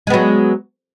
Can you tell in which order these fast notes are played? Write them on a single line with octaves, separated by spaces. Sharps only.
G#3 B3 F#3